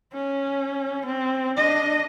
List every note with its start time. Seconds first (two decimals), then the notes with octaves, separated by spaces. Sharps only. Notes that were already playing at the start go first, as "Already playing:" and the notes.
0.13 C#4
1.06 C4
1.57 D4 D#5